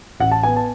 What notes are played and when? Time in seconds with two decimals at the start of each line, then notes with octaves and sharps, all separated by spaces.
0.20 A1 F#5
0.32 A5
0.43 B3 G#5
0.56 A5